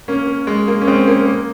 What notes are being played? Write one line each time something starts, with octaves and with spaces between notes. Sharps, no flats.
A#3 C#4
A#3
G#3
A#3
C#4
G#3 C4
A#3 C#4
A#3